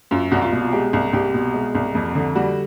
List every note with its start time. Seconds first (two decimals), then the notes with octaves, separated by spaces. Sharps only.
0.11 F#2 F4
0.32 C2 F#4
0.42 F4
0.52 B2
0.62 F4
0.72 G#3 G4
0.93 C2
1.13 C2 G4
1.34 B2
1.54 G#3
1.75 C2
1.95 F2
2.15 D3
2.35 G3 F#4